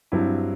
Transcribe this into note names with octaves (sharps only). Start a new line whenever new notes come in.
G2 F#3 C4 E4